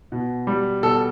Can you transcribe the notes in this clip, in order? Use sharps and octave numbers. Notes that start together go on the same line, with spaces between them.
B2
G3
B2 A4